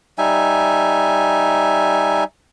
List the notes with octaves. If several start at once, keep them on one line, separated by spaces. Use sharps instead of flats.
G3 D#4 E5 G#5